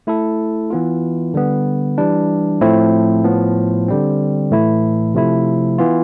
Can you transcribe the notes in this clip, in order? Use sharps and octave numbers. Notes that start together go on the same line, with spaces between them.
A3 E4 A4
E3 B3 F4
D3 G3 B3
E3 G3 D4
A2 F3 A3 C4 E4
A2 F3 B3
D3 G3 C4
A2 E3 A3 E4
C3 F3 A3 E4
E3 B3 F4